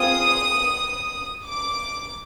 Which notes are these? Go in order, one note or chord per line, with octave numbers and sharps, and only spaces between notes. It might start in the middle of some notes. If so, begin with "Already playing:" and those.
Already playing: C4 F4 G#4 D#6
D6